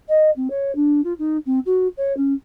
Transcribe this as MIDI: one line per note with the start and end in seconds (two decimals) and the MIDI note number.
0.09 0.31 75
0.36 0.48 60
0.50 0.72 73
0.76 1.01 62
1.04 1.14 65
1.19 1.37 63
1.46 1.59 60
1.66 1.88 66
1.97 2.16 73
2.17 2.33 61